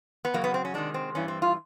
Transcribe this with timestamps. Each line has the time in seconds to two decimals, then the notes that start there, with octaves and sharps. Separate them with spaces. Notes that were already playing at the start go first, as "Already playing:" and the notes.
0.25 B3
0.34 F#2 C#3 F#3 A#3
0.44 B3
0.54 C4
0.65 C#4
0.74 C3 D#3 G#3 D4
0.94 C4
1.15 G2 E3 G3 C#4
1.28 C4
1.42 F4